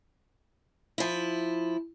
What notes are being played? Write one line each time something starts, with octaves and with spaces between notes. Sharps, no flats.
F3 E4